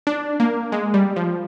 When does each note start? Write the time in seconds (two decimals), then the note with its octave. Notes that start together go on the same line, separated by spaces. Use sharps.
0.07 D4
0.40 A#3
0.72 G#3
0.94 G3
1.16 F3